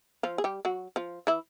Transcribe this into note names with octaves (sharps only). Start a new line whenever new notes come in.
F3 F4
G#4
G3 G4
F#3 F#4
F3 F4
E3 E4